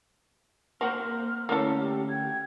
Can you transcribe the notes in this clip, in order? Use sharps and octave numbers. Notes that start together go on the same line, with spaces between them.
A#3 C4 F#4 A#4 C5 F6
D2 A3 A#3 C#4 E4 A4
G4
G5 G#6